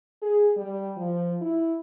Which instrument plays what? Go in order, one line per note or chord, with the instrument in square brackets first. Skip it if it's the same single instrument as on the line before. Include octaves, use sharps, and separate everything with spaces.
[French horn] G#4
G3
F3
E4